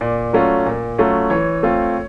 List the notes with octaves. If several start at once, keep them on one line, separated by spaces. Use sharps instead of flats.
A#2 D5
F#3 A3 C#4 F4
A#2
F#3 A3 C#4 F4
E3 C#5
A3 C4 F4